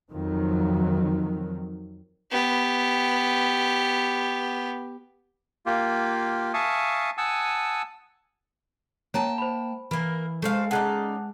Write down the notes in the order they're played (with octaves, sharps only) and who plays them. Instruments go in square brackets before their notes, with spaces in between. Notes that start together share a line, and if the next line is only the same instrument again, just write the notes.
[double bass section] F2 D#3 F#3
[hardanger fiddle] B3 G4
[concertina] A#3 F4 G4
E5 F5 G#5 A5 C#6 D#6
F#5 G#5 A5 D#6 E6
[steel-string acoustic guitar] A#3 G5 A5 [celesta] C#5 A#5
[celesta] C5 B5
[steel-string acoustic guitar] E3 [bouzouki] A#3 A#4 [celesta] B5
[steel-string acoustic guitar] G#3 [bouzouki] A3 C5 F5
[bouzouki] C#3 D#4 D5 [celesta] F#5 A5 F#6